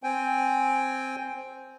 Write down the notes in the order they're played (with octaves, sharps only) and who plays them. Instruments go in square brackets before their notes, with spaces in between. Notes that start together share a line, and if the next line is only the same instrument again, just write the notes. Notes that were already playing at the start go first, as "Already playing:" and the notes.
[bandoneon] C4 G5 G#5